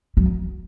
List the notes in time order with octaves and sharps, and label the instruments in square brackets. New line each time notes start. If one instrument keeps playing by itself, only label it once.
[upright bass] F#3